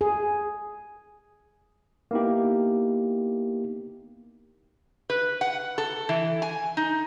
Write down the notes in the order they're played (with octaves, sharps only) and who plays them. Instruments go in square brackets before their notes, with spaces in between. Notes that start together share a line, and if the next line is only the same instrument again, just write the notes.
[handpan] G#4
[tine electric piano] A#3 B3 D#4 E4 G4
[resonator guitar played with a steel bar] B4
F#5
A4
E3
G#5
D#4